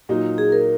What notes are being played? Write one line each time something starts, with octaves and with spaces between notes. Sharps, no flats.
A#2 F#3 D#4
G#4
A#4